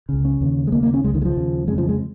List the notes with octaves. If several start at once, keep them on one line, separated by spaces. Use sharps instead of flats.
C#2 C#3
C#4
D#2 C#3
G#3
D#2 C#3 A#3
A#3
C#4
C#2 C#3 G#3
D#3
G#3
F3
D#2 C#3
F2 C#3 G#3
F3
G#3